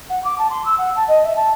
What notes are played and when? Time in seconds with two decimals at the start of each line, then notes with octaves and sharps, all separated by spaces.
0.09 F#5
0.24 D6
0.38 A5
0.50 C6
0.65 E6
0.78 F#5
0.95 A5
1.07 D#5
1.23 E5
1.35 A5